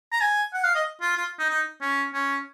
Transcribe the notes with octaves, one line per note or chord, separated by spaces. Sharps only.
A#5
G#5
F#5
F5
D#5
F4
F4
D#4
D#4
C#4
C#4